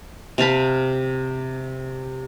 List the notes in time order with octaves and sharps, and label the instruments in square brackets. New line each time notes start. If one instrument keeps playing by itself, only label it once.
[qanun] C3 F5 A5 B5